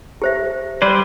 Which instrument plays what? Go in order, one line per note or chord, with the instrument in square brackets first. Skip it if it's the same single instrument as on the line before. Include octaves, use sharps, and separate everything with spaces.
[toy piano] G4 C5 E5
[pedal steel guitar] G3 B4 C5 [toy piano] D5